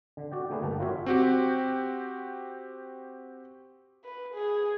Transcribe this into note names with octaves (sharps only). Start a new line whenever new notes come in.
D3
F#4 D5 G5
D3 A3 A#3 G#4 B4
G1 A#3 G5 A5
F4 F#4 A#4 C#5 E5 F5
C4 F#4 G4
B4
G#4